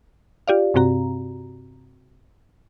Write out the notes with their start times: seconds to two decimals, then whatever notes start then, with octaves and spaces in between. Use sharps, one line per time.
0.48 F4 G4 D5 F5
0.74 G2 C3 C4 F#4 A#5